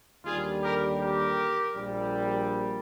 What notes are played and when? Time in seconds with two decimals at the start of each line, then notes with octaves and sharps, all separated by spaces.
0.25 D#2 D3 G3 F4 G#4
0.62 G4 A#4
0.99 G4 A#4
1.74 A#1 A#2 G3